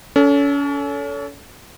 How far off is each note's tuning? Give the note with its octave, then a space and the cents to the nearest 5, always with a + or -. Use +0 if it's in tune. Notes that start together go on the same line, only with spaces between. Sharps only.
C#4 +35 A4 +0